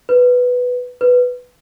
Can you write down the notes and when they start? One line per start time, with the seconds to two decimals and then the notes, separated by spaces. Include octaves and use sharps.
0.09 B4
1.01 B4